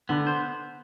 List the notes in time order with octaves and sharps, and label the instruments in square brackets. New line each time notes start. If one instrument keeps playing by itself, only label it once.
[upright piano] D3 [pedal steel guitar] B3
[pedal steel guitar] C5